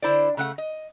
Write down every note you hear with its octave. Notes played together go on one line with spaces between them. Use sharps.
D3 E4 C5 D5
C#3 A3 F#5
D#5